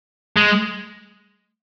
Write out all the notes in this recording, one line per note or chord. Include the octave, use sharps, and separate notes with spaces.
G#3